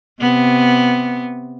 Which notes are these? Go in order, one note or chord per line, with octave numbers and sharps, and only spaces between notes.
C3 B3